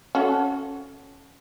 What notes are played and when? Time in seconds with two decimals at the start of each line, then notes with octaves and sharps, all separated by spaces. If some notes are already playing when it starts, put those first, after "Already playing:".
0.15 C#4 F#4 A4